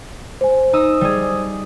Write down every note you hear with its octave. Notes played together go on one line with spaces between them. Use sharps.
C5 G#5
D#4 D#6 E6
G3 G#4